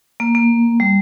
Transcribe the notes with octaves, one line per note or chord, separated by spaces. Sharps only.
A#3
A#3
G3